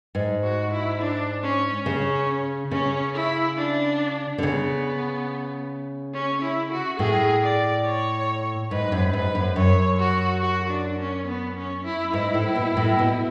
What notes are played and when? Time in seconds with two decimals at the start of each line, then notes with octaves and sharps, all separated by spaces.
0.15 G#2
0.43 F#4
0.72 E4
1.00 D4
1.43 C#4
1.86 C#3 C#4
2.71 C#3 C#4
3.15 E4
3.57 D4
4.38 D3
4.42 C#3 B3
6.14 C#4
6.42 E4
6.71 F#4
6.99 A2 G#4
7.42 D5
7.85 C#5
8.71 G#2 B4
8.92 F#2
9.13 G#2 B4
9.35 F#2
9.56 F#2 C#5
9.99 F#4
10.42 F#4
10.70 D4
10.99 C#4
11.27 B3
11.56 C#4
11.84 E4
12.13 G#2 E4
12.34 A2
12.55 B2
12.77 A2
12.99 B2